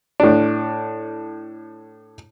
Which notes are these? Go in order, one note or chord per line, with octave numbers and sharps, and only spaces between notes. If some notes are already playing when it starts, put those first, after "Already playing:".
A2 D4